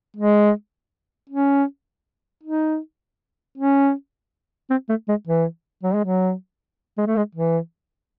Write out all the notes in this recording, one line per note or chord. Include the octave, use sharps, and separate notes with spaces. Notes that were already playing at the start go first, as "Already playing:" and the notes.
G#3
C#4
D#4
C#4
C4
A3
G#3
E3
F#3
G#3
F#3
G#3
A3
G#3
E3